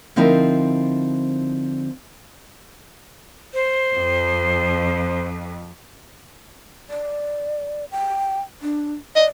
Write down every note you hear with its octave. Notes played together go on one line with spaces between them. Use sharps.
D3 F3 C4 D#4 E4 A#4
C5
F2
D5
G5
D4
D5 D#5